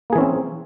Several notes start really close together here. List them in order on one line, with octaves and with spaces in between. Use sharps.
A#3 G#4 E3 C#4 C4